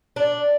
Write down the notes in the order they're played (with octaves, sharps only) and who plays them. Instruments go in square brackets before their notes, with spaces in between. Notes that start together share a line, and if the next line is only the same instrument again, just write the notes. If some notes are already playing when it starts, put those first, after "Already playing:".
[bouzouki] D4